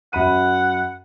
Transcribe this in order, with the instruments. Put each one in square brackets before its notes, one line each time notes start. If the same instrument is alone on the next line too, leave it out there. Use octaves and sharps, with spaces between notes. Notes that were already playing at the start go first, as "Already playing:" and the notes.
[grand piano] F#2 B5 D#7 [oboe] F#5